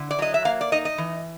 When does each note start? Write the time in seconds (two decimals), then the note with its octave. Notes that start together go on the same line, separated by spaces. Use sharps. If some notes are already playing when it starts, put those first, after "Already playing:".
Already playing: D3 E4
0.11 D5
0.19 F#3 D#5
0.34 E5
0.45 A#3 F5
0.61 D5
0.72 D#4 D#5
0.85 D#5
0.98 E3